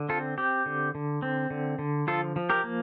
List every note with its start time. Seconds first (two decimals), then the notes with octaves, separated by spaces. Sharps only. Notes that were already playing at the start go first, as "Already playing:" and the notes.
Already playing: D3
0.09 C4 F4 A4
0.38 C4 G4
0.66 D3
0.95 D3
1.22 C4
1.51 D3
1.79 D3
2.07 F3 F4 A4
2.36 F3
2.50 G4 A#4
2.64 A#3